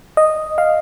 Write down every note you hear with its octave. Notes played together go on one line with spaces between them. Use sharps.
D#5
F5